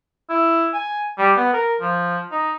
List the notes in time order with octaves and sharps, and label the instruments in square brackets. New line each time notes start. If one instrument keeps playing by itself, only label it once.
[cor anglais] E4
G#5
G3
B3
A#4
F3
D#4